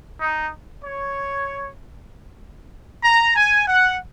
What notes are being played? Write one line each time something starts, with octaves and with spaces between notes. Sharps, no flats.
D#4
C#5
A#5
G#5
F#5